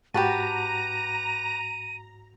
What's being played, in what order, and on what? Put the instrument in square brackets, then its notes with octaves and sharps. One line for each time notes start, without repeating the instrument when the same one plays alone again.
[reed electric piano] G#2 F#4 F#5 [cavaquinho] G4 B4 A5 [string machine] A#5 [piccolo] D#7